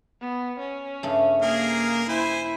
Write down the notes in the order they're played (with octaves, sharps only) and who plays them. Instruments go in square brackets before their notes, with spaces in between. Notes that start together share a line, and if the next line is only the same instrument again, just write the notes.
[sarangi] B3
C#4
[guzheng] G2 C#3 A3
[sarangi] A#3 [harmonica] G#4 A#4 F5
[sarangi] E4 [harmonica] C5 G#5